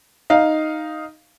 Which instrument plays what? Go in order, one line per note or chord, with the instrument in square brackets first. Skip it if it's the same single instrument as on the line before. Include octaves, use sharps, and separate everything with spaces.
[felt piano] D#4 F5